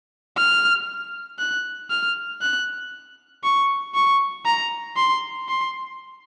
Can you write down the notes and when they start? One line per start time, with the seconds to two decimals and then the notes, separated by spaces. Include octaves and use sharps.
0.37 F6
1.39 F#6
1.91 F6
2.42 F#6
3.44 C#6
3.95 C#6
4.46 A#5
4.97 C6
5.49 C6